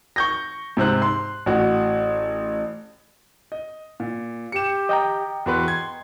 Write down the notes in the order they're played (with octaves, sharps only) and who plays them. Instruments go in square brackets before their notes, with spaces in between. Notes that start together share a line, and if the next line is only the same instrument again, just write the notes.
[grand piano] C#6 G6 A#6
G#2 C3 C5 F#6
C6
A1 F#4
D#5
A#2
[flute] G4 [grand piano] C#7 E7
[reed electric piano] D#5 G5 A#5
[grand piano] E2 F#4 B4 [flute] C6
[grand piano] G#6